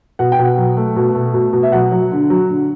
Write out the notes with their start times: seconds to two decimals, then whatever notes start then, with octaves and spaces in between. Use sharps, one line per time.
0.19 B2 F#5
0.32 G5
0.39 B2 F#5
0.58 F#3
0.77 A3
0.96 B2
1.15 A3
1.34 B2
1.53 B2
1.63 E5
1.72 F#3 F#5
1.92 F#3
2.11 D3
2.30 F#3
2.49 D3